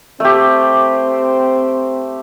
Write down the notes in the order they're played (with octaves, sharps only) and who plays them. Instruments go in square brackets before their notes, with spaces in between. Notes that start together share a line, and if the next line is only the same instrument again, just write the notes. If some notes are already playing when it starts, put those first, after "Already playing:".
[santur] A3 G4 [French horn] C4